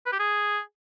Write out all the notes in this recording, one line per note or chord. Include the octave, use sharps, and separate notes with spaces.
B4
G4
G#4